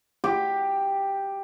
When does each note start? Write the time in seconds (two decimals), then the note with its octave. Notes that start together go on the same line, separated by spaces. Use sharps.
0.24 G4